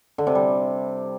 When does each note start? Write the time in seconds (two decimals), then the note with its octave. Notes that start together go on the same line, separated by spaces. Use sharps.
0.18 D3
0.27 C3
0.35 G3